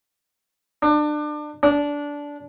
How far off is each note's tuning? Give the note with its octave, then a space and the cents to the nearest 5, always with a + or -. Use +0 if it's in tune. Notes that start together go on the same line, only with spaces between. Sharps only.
D4 +30
D4 -15